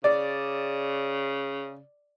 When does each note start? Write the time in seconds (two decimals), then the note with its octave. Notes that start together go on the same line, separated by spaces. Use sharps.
0.04 C#3 D5